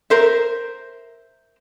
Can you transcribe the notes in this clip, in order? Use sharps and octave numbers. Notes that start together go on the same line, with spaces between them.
A#4 C5 E5